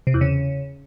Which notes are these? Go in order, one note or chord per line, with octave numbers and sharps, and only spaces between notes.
C3
E2
C#3